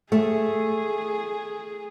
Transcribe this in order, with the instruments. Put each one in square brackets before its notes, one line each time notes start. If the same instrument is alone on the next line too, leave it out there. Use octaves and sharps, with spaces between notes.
[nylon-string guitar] A3 [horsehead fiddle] G#4